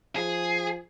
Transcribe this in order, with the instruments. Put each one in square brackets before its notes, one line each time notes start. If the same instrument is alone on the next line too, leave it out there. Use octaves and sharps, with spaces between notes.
[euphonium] F3 [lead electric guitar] G#4